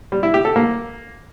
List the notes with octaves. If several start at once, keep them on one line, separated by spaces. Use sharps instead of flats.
G3
E4
G4
A4
A#3